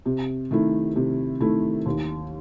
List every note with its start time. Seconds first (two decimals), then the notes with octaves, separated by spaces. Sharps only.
0.06 C3
0.51 D#3 A3 E4
0.96 C3
1.41 D#3 A3 E4
1.86 D#2